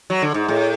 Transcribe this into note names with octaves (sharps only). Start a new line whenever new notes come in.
F#3
D3
G#2
A2